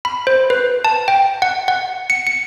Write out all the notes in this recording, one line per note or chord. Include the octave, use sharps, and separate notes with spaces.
B5
C5
B4
A5
G5
F#5
F#5
C#7
C#7